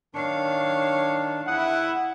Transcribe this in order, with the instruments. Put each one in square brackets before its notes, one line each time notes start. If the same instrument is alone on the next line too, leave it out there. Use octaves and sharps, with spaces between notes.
[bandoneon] D#3 D4 [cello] C#5 F5
[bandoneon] E2 D#6 [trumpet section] E4 F#5